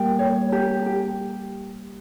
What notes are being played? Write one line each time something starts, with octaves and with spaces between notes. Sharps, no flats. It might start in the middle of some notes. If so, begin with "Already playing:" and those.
Already playing: G3 A#3 G5
C#5
G4
G4